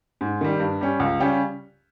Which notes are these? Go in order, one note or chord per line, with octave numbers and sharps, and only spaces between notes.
G#2
D#3 G3
G2
G3 C#4
C#2
C#3 G3 C#4 G4